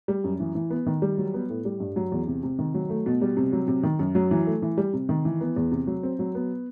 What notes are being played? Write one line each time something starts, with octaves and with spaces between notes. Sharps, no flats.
G3
F#2
E3
E3
B3
D#3
G3
F#3
B3
A2
G3
G2
F#3
E2
C3
C3
D#3
F#3
A3
B2
G3
C3
F#3
C3
D#3
F#2
F#3
E3
A3
E3
G3
C3
D#3
E3
B3
E2
C3
F#3
C4
F#3
B3